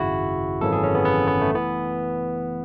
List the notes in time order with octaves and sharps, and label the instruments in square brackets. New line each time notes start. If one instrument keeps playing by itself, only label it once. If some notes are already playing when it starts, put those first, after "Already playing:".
Already playing: [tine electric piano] G#1 F#2 C#3 E4 F#4
G#1 F#2 C#3 E3 A4
G#4
C#4
B3
B3
B3
A3
E3 B3